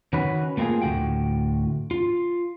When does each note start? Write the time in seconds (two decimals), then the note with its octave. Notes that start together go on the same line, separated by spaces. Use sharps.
0.13 D#3 C#4 F#4 B4
0.57 A3 A#3 C4 D#4 F4 G#4
0.82 D2 A2 F#3 F#4 G5
1.91 F4